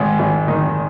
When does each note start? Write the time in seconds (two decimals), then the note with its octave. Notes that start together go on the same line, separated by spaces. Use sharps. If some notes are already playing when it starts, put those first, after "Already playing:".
Already playing: G#1 G#2
0.19 G#1
0.48 D#3